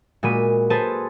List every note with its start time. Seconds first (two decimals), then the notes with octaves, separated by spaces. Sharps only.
0.23 A#2 G#3 F#4 B5 D#7
0.70 G#4 A4 B4 C5 G#5 A5